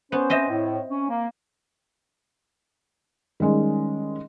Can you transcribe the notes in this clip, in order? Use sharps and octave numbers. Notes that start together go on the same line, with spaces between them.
B3 C#4 C5
C4 D#5 E5
A2
C#4
A#3
D#3 G3 G#3 C#4